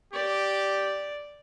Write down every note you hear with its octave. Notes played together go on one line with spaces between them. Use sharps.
G4 D5